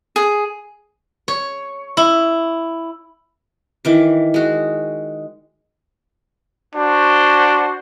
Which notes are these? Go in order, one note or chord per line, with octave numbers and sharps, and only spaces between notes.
G#4
C#5
E4
D#3 E3 D6
G#3 F#4
D4 F#4 C5